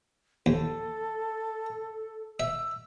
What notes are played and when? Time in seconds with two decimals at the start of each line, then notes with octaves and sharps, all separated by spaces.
0.46 D#2 A4
2.40 E5 E6